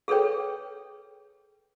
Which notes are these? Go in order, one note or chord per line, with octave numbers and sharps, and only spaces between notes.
G#4 A4 B4 C#5 G5